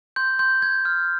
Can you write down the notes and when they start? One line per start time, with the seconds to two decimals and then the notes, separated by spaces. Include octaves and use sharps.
0.16 C6 G6
0.39 C6 G6
0.62 G6 G#6
0.85 F6